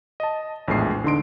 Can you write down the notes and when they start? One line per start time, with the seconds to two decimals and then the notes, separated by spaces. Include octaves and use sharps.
0.20 D#5 A5
0.68 A#1 E2 A2 G#3 C7
1.04 D3 D#4 C6 D7